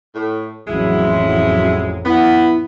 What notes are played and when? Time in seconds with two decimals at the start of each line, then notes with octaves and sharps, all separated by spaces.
0.15 A2
0.68 A1 F2 F#3 G#3 E4
2.06 B3 E4